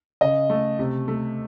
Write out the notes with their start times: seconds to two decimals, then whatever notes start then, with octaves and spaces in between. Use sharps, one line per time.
0.21 C#3 D#5
0.50 A3
0.79 C3
1.08 A3